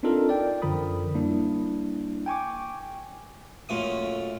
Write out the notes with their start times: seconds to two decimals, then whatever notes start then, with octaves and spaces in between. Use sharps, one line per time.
0.03 C4 D4 D#4 F4 A4 A#4
0.29 D5 G5
0.62 F#2 D3 F3 A#4 B5 D#6
1.15 G3 A#3 D4 E4
2.26 G5 G#5 C#6 D6
3.69 F#2 A#2 A3 D#6